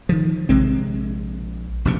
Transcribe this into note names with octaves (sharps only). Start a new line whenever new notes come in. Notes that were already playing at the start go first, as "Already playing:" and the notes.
D#3 F3
A#1 C3 G#3 C4
F1 A#1 C3